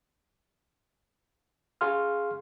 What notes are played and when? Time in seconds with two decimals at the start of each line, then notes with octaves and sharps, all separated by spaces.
1.81 G#4 F5 C6 F6